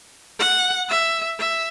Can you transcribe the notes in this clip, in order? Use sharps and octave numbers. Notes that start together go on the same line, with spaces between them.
F#5
E5
E5